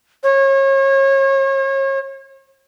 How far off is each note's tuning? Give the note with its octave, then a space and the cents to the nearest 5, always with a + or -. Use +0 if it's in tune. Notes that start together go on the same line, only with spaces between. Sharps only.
C#5 -35